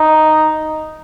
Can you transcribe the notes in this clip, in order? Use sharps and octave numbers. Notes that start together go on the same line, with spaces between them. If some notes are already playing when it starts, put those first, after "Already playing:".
Already playing: D#4